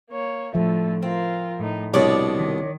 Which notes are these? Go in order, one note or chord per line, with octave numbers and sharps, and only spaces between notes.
A#3 C#5
A2 D3 F3 A3 E5
C4 F4 A#4
A2 D#4
C2 B2 D4 C#5 D5
D#3